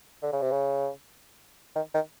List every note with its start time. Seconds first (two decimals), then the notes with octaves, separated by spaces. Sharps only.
0.23 D3
0.33 C#3
0.42 C3
0.52 C#3
1.76 D#3
1.94 D#3